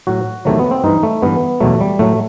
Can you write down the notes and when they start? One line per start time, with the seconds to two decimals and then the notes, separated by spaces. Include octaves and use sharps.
0.07 A2 F#3 F#4
0.45 E2 C3 D#3 F#3 A3
0.59 B3
0.71 C4
0.84 G2 E3 D#4
1.03 A3
1.22 G2 E3 B3
1.61 E2 B2 F#3 A3
1.81 G3
1.99 A2 F#3 A3